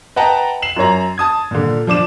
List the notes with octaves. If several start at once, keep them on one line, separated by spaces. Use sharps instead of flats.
B4 D#5 F#5 G5 A5 A#5
C7 E7 F#7
F#2 A#4 C#5 A#5
A5 D#6 G#6
A#2 D3
F3 D4 D6 E7